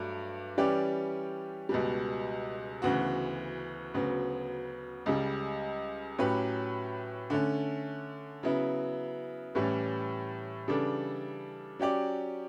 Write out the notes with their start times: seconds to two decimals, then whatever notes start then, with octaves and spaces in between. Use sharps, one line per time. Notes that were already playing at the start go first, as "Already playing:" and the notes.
Already playing: G2 F#3 A3 D4
0.57 E3 G3 C#4 G4 D5
1.69 C#2 B2 G3
2.82 D2 C#3 E3 B3 F#4
3.94 D2 C#3 F#3 B3
5.06 C#2 C#3 G3
6.19 A2 F#3 C#4 G4 B4
7.30 D3 A3 C#4
8.43 C#3 F#3 B3 E4
9.55 A2 E3 G3 C#4
10.68 C#3 E3 G3 D4 A4
11.79 F#3 C#4 G4 D5